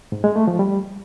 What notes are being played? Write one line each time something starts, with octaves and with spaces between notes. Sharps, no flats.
G#2
G#3
A3
F3
G3